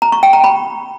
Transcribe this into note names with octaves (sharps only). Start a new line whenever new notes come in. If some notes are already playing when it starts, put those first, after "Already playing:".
A#5
C#6
G5
A#5
B5